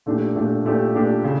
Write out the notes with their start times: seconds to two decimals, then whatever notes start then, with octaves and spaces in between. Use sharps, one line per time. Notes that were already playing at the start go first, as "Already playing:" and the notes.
0.06 A#2 A3 D4 G4
0.36 A#2 A3 D4 G4
0.65 A#2 A3 D4 G4
0.95 A#2 A3 D4 G4
1.24 C#3